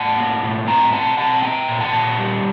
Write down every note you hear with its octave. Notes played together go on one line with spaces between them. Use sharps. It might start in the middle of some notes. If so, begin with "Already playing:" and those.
Already playing: A2 F#5 A5
A#3
A2
C4 G5 A#5
C4 F#5 A5
C4 F#5 A5
A#2 G5 A#5
A#2
F#5 A5
A#2
G3